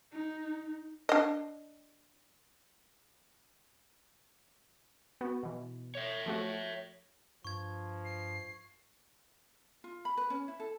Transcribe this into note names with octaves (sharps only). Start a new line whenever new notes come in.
D#4
D4 D#5
B3 F#4
B2 E3
C#5 E5
F3 A3 F#4
G2 F3 C#6 G#6
C7
F4
B5
B4
C#4
E4
A4